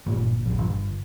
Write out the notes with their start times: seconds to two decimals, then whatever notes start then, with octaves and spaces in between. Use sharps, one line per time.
0.06 G1 A#2
0.46 E1 A#1
0.59 G1